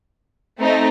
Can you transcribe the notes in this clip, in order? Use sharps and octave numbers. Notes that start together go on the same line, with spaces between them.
A3 C4 D#4